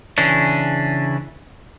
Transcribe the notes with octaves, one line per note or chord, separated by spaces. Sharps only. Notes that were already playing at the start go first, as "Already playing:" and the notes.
C#3 E3 C#4 D4